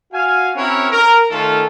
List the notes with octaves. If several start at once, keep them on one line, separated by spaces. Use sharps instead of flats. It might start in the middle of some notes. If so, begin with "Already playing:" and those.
F#4 F5 G#5
C4 C#4 E4 F#4 A#4 C#5
A#4
D#3 A3 C#4 F4 A4 F5